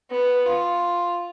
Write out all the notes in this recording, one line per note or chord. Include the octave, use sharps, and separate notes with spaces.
B3
F4